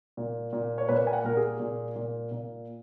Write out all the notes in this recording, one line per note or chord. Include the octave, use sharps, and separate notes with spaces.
A#2
A#2
C#5
A#2 B4
G#5
F#5
A#2 A#4
G#4
A#2
A#2
A#2